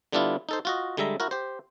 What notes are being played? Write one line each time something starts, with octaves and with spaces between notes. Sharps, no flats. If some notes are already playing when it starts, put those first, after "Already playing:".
D3 G3 B3 D4 E4 F4
D#4 A4 C5
F4 F#4 D#5
D3 G3 G#3 E5 A#5
E4 F#4 A#4
G4 C5